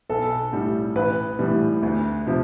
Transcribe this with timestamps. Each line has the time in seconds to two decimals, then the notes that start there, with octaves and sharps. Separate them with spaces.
0.09 B1 A4
0.53 A2 G3
0.95 A1 B4
1.39 A2 E3 G3
1.82 D2
2.26 C3 F3